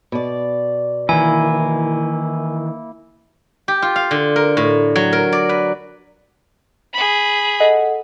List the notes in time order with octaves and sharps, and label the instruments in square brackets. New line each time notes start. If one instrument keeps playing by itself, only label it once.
[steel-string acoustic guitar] B2 D5
[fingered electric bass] D#3 E3 [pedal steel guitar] A#3 E4 [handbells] G#5
[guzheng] G4
F4
F5
D3
A#4
A2
F#3
A#4
D5
B4
[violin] G#4 B5
[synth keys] A4 D#5 F#5